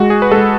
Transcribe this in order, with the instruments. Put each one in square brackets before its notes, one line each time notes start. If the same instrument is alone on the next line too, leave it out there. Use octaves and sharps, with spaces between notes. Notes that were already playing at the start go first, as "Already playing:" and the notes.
Already playing: [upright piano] G#3 [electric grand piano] F#4
[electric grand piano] G#4
B4
[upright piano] G#3 [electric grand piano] A4